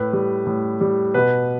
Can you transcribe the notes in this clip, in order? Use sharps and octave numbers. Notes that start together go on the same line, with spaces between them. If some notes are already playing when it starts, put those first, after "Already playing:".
Already playing: A2 B4
G3
A2
G3
B2 B4